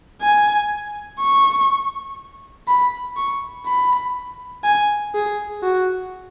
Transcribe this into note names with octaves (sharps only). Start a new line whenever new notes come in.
G#5
C#6
B5
C#6
B5
G#5
G#4
F#4